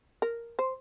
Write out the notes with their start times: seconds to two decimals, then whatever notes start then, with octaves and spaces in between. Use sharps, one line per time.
0.22 A#4
0.59 C5